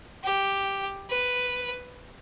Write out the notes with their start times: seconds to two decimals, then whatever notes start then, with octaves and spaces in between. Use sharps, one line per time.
0.24 G4
1.09 B4